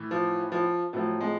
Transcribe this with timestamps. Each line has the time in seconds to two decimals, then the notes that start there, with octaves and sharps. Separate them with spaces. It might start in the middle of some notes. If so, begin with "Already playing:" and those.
Already playing: A2 E3
0.11 F3
0.52 F3
0.93 A2 F3 F#3
1.21 G#3